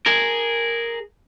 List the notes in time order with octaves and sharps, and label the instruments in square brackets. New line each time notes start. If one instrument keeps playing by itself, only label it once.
[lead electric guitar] G#4 A#4